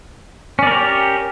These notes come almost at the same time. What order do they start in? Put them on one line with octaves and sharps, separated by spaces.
C#4 D5 A#4 G4